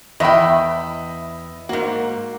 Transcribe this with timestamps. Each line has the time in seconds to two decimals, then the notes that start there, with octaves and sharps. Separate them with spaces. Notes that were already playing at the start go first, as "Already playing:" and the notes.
0.20 E2 D#5 E5 G5 B5
1.69 G#2 A#3 F#4